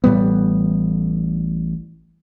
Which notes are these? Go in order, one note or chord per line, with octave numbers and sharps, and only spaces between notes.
A1 A2 G3 B3